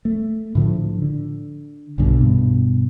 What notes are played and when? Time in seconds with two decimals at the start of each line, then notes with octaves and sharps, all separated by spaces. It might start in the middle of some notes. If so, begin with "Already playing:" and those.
0.05 A3
0.55 A2 D3 F3
1.02 D3
1.98 B1 G2 B2 D3
2.21 G2 B2